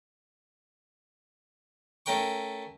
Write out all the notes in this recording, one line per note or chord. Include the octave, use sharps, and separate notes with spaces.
A3 C#4 A#4 G5 C#6